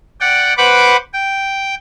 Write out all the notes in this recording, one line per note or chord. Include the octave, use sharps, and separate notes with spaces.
D5 F#5 G5
B4 C5 F#5 B5 D6
G5